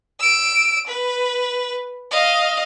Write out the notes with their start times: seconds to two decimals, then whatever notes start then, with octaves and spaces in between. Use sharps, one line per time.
0.20 E6 D7
0.87 B4
2.11 D#5 F5